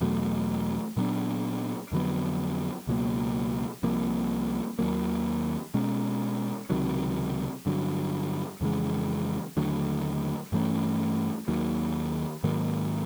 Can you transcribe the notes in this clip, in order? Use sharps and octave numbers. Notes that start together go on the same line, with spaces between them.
E2 B2 F#3 A3
A#2 F#3 B3 D4
F2 D3 F#3 B3
C#2 B2 F#3 A#3
C2 C3 F3 A#3
D#2 D#3 F#3 A#3
B2 G#3 C#4
C#2 C3 D#3 F#3
G2 D3 F#3
F2 C#3 E3 G#3
D#2 D3 F#3 A3
G2 E3 A3 C#4
D#2 D#3 F#3 A#3
G#2 D#3 F#3 A#3